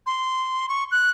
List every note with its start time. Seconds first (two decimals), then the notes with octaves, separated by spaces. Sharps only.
0.06 C6
0.69 C#6
0.91 F#6